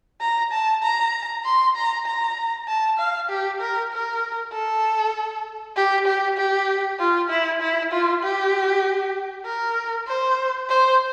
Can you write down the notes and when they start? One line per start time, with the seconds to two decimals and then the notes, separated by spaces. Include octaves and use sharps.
0.21 A#5
0.52 A5
0.83 A#5
1.45 C6
1.76 A#5
2.06 A#5
2.68 A5
2.98 F5
3.29 G4
3.61 A#4
3.92 A#4
4.52 A4
5.76 G4
6.06 G4
6.37 G4
6.99 F4
7.29 E4
7.61 E4
7.91 F4
8.23 G4
9.45 A#4
10.07 C5
10.69 C5